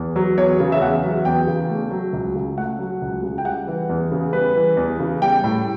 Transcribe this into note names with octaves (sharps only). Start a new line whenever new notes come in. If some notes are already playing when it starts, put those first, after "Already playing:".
Already playing: E2
F#3
E2 C#5
C#3
E5
E2 F#5
F#3
E2 G5
C#3
A3
F#3
C#2
C#3
A3 F#5
F#3
C#2
C#3
G5
G3 F#5
E3
E2
C#3
G3 B4
E3
E2
C#3
G3 G5
A2